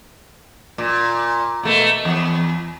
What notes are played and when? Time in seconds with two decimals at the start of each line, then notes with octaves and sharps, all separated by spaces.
0.78 A#2
1.63 B2 A3 A#3
2.05 E2